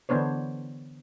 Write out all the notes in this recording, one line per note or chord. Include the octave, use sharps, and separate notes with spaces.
D3 E3 B3 D4 C5 C#5